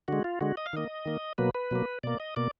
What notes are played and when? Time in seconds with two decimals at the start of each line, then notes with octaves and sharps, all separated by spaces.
0.08 D3 G#3 F#4
0.24 F4
0.41 D3 G#3 F#4
0.57 D#5
0.66 F5
0.73 D#3 A#3 D#5
1.05 D#3 A#3
1.38 B2 F#3 A#3 B4
1.55 B4
1.71 B2 F#3 A#3
2.03 B2 A#3 D5
2.20 D#5
2.36 B2 A#3 D5